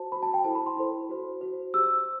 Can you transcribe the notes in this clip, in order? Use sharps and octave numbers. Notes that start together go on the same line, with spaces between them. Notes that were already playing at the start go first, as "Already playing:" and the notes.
Already playing: F#4 C5 A5
F#4 C5 B5
A5
G5
E4 A4 C5 A5
B5
C6
E4 A4 C5
F#4 C5
F#4 C5
G4 C5 E6